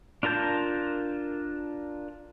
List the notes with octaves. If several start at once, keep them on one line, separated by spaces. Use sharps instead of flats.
D4 F4 A#4 A5 G6